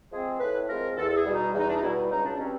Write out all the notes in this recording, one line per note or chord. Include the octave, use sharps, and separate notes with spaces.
F3 G#3 C4 G#4
A2 B4
F3 G#3 C4 A#4
E2 A4
A4
G#4
B2 G3
D#4
E2 D#4
D4
D#4
B2 G3 E4
C#2 D#4
D4
B2 G3 C4 C#4